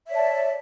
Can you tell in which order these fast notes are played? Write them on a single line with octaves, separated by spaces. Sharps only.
E5 C#5 D5 A5